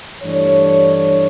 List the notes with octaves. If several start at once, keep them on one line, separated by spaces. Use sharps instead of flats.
G2 E3 A3 D4 C#5